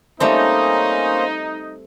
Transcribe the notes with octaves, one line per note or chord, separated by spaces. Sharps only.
G3 A3 A#3 C4 C#4 D#4 C5